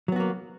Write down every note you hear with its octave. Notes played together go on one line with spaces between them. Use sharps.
F#3 A#3 B3 F#4